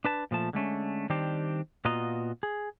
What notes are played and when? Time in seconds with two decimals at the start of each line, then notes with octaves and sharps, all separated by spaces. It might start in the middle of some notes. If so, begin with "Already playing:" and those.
0.05 D4 B4 A5
0.31 A#2 F3 A3 A5
0.53 D3 G#3 A3 C#4
1.10 D#3 G3 C4 D4 G4 C5
1.85 A#2 B3 F4 F#4 D#5 A#5
2.43 G#4